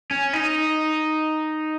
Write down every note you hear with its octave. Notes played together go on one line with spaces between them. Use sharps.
C#4
D#4